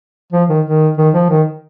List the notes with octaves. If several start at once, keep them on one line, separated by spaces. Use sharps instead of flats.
F3
D#3
D#3
D#3
F3
D#3